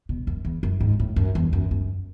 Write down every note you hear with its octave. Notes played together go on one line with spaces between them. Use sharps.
B2
F#2
E2
F#2
G#2
A2
F#2
E2
F#2
F#2